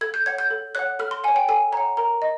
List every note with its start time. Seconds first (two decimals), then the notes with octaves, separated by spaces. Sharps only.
0.01 A4 G#6
0.14 G6
0.26 C#5 F#5 G#6
0.39 G6
0.50 A4
0.75 C#5 F#5 F#6
0.99 A4 F6
1.11 C6
1.24 F#5 G#5
1.28 C#5
1.36 G5
1.48 A4 G#5
1.72 C#5 F#5 A#5
1.97 A#4 A#5
2.22 D#5